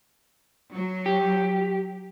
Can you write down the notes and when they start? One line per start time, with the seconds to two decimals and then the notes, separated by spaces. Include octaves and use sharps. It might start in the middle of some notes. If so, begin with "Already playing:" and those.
0.75 F#3
1.06 G4